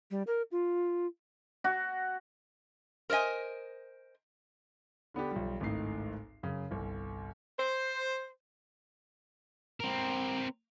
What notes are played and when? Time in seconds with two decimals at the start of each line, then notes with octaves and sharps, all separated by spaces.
0.11 G3
0.27 A#4
0.52 F4
1.64 F#4
3.10 A#4 C5 D5 D#5 G#5
5.14 D3 B3 D4 G4
5.31 B1 F3 G3
5.60 G#1 C#2 A2 D#4 C7
6.43 F#2 C#3
6.71 G1 C2
7.58 C5
9.80 C4 A#4